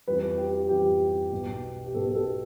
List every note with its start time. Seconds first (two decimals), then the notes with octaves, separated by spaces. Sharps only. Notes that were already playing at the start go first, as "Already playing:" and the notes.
0.07 F2 E3 G3 B4
0.38 G4
0.54 G4
0.69 F2 E3 G3 G4
1.32 B1 B2 B3
1.86 G4
1.94 B1 B2 B3 A4
2.15 A4